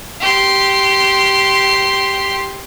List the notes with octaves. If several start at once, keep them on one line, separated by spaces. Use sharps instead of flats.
G4 C6